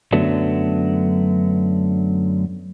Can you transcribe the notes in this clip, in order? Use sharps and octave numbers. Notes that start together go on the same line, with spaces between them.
F#2 D3 F#3 A3 B3 D4